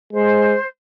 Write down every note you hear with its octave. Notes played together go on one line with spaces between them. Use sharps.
G#3 C5